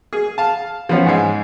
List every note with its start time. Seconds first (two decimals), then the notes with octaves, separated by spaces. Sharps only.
0.13 G#4
0.38 F5 A5
0.89 F3 B3 C#4
1.06 G#2 G#3